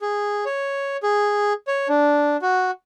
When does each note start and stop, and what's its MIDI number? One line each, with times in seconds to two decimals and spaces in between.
0.01 0.45 68
0.45 0.97 73
1.03 1.53 68
1.67 1.88 73
1.88 2.37 62
2.42 2.71 66